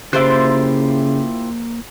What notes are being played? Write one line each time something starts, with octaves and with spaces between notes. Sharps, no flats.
C#3 A#3 E4 F4 G4 C5 F#6